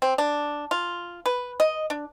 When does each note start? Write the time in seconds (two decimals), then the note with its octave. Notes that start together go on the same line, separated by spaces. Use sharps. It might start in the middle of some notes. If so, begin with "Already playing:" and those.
0.02 C4
0.18 D4
0.71 F4
1.26 B4
1.60 D#5
1.90 D4